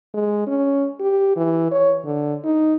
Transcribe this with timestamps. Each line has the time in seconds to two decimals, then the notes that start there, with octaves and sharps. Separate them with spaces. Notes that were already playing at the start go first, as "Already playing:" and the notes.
0.14 G#3
0.47 C#4
1.00 G4
1.37 E3
1.71 C#5
2.05 D3
2.44 D#4